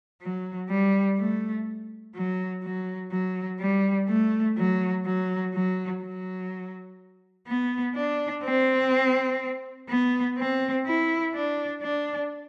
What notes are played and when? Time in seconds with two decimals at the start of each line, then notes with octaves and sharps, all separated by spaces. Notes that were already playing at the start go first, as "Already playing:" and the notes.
0.22 F#3
0.70 G3
1.18 A3
2.15 F#3
2.64 F#3
3.11 F#3
3.60 G3
4.08 A3
4.57 F#3
5.05 F#3
5.54 F#3
6.03 F#3
7.48 B3
7.95 D4
8.44 C4
9.89 B3
10.38 C4
10.86 E4
11.34 D4
11.83 D4